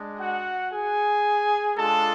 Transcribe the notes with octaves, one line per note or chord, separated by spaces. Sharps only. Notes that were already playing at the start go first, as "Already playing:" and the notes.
Already playing: G#3 D4
F#4 F#5
G#4 G#5
G#3 D4 F4 A4 A5